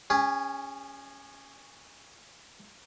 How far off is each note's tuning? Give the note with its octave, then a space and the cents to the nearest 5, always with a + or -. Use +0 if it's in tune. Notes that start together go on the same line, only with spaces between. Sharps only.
C#4 +0 G#4 -45